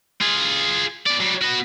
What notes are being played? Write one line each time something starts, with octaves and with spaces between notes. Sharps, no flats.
F4 G#4
B3 D5
F#3 G3
B3 F#4